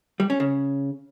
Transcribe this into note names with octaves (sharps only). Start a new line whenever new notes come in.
G3
C#4
C#3